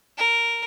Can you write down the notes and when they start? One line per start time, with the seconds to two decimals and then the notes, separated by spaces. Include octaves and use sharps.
0.18 A#4